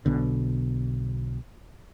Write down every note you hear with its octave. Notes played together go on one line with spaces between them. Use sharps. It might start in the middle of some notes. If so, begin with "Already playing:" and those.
B1 B2 D3